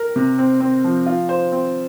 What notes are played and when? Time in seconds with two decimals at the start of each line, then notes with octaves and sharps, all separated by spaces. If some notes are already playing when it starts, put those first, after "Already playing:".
Already playing: A#4
0.16 C3
0.38 C4
0.61 C4
0.84 F3
1.06 F4
1.29 C5
1.52 C4